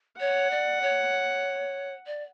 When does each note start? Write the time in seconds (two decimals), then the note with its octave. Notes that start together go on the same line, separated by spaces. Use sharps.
0.19 C#5 F#5
0.51 D5
0.82 C#5
2.06 D5